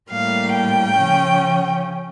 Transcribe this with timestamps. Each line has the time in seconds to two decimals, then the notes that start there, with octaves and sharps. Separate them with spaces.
0.11 A2 G3 A#3 F5
0.54 G5
0.97 C#3 F3 C#4